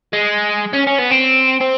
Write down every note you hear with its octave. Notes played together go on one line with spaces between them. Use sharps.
G#3
C#4
C#4
B3
C4
C4